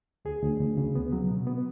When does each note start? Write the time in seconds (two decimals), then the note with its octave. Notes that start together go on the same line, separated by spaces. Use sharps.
0.25 D2 G#4
0.42 D2
0.60 D2
0.77 C#3
0.95 B3
1.13 F#3
1.30 B2
1.47 B3